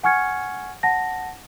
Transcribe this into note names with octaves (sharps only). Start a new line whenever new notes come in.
F#5 G#5 C#6 F6 G#6 C#7
F#5 A5 A#6